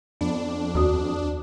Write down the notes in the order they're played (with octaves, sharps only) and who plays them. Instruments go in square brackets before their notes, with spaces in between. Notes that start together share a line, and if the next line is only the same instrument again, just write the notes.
[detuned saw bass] F2 [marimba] B3 [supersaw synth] D4
[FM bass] D#2 [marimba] F#4 D#6